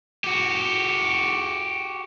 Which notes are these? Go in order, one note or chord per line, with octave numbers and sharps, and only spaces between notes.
F#4 G4